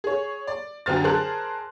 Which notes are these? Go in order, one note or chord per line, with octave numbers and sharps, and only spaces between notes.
G#4 C#5
D5
F#2 D3 C4 F6 A6
G#4 A#4 C5 A5 F#6